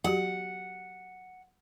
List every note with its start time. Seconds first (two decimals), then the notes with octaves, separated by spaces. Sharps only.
0.04 F#3 F#4 G4 F#5